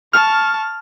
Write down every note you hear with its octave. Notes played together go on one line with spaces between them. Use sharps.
A5 C#6 F6